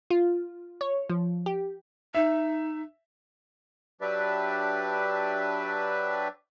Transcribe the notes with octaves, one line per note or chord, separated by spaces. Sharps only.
F4
C#5
F3
G4
D#4 E5
F#3 D4 G4 B4 D5 E5